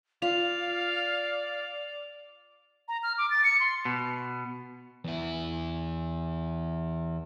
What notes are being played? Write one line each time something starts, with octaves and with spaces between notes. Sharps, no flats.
F4 D5 F5 F7
A#5
F6
D6
A6
C#7
C6
B2
E2 E4